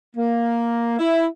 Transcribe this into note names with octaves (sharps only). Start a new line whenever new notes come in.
A#3
E4